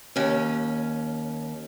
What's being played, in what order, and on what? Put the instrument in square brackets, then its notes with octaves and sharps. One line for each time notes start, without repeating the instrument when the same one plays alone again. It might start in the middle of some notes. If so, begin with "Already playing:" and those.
[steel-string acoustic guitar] D#2 C#4